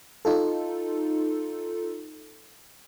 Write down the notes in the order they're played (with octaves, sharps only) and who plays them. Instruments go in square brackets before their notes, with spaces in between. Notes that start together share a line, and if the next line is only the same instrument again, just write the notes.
[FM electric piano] D#4 F4 A4